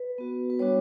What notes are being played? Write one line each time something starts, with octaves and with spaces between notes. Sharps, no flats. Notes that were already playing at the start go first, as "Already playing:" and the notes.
Already playing: B4
B3 F#4
B4
G3 B3 D4 F#4 C#5